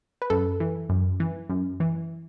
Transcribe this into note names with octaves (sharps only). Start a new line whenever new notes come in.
B4
F#2 A4
E3
F#2
E3
F#2
E3